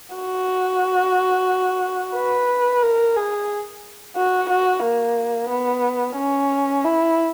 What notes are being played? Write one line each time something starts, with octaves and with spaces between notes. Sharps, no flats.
F#4
B4
A#4
G#4
F#4
F#4
A#3
B3
C#4
E4